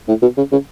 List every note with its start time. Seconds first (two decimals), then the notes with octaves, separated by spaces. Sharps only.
0.08 A2
0.22 B2
0.37 C#3
0.52 C#3